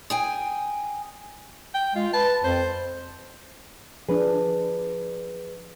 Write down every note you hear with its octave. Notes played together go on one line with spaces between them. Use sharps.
G#4 G5 G#5
G5
G#3 F4
B4 A5
F2 C5
F3 D4 G#4 B4